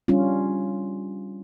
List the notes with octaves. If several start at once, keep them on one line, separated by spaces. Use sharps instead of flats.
G3 C#4 D4 F4